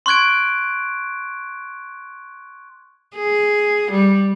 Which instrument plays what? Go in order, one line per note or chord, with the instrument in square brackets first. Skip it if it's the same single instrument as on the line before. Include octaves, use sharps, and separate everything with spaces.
[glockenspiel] C6 C#6 F#6 G#6 D7
[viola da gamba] G#4
G3